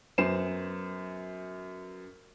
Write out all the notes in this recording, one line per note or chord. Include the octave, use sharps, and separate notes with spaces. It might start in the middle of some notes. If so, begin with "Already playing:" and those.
F#2 B3 C5 C7 E7